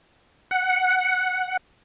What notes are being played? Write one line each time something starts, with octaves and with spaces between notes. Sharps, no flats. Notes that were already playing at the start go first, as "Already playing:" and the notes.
F#5